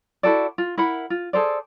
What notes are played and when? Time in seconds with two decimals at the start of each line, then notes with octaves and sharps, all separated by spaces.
0.23 E4 F#4 A4 D5
0.58 F4
0.78 E4 A#4 F#5 B5
1.10 F4
1.33 G#4 A4 C5 D5